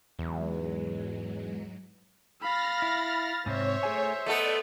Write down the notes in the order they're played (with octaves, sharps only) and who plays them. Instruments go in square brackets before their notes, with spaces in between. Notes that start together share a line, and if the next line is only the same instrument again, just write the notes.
[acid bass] E2 [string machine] G#2 F#3 G#3
[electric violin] F5 B5 [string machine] F6 A6 A#6
[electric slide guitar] E4
[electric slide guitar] G#2 C3 C4 [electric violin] C5 E5 [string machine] C#5
[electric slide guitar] A3 G#4 G#5
[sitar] A3 B3 A4 [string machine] D5 [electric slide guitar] D#5